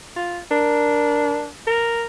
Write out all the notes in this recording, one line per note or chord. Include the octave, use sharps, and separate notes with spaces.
F4
D4 A#4
A#4